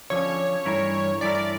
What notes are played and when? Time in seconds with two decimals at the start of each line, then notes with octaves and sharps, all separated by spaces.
0.10 D3 F3 C#4 C#5
0.65 G2 E3 A3 E4 A#4
1.21 G2 E3 A3 E4 A#4 D5
1.35 D5